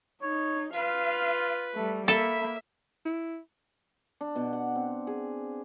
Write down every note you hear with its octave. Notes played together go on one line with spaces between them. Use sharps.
D#4 C#5
F4 B4 F5
G3 A3
A#3 A4 E5 B5
E4
D4
B2
F#5
C4
G#4